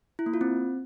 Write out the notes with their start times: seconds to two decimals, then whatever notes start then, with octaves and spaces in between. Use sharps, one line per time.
0.19 E4
0.26 A#3
0.34 F4
0.41 C4